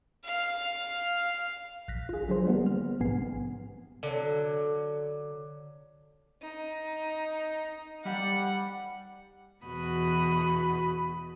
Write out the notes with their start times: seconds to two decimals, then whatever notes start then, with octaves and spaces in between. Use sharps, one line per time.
0.24 F5
1.88 A#1 F#6 A#6 B6
2.09 F4 G#4
2.28 D3 F#3 G#4 C5
2.47 G3 A#3 B3
2.66 F6
3.00 A#1 G#2 C3 B3 G#5 C7
4.03 D3 F#3
6.42 D#4
8.05 G3 F#5
9.64 E2 B2 F#4 B5 D#6